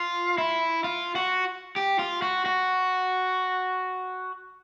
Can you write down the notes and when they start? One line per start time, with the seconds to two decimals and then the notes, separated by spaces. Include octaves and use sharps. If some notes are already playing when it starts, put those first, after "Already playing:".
Already playing: F4
0.38 E4
0.84 F4
1.16 F#4
1.76 G4
1.99 F4
2.22 F#4
2.46 F#4